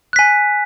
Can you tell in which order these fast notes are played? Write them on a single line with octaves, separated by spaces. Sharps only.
F#6 B6 G#5